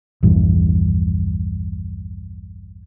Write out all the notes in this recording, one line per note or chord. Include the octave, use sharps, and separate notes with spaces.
A#1 E2 G2